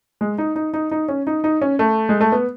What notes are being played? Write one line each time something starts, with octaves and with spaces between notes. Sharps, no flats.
G#3
D#4
D#4
D#4
D#4
C#4
D#4
D#4
C#4
A3
G#3
A3
B3